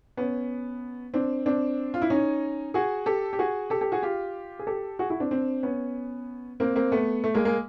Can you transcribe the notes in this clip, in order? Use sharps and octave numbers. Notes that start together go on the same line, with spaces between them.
B3 C#4
C4 D4
C4 D4
F4
E4
C#4 D#4
F#4 G#4
G4 A4
G4
F#4 G#4
G4 A4
G4 A4
F#4 G#4
F4 G4
G#4
G4 A4
F#4 G#4
E4 F#4
C4 D4
C4 D4
B3 C#4
A#3 C4
A#3 C4
A3 B3
A3
G#3 A#3
G#3 A#3